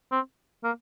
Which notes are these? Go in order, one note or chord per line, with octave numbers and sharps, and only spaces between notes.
C4
A#3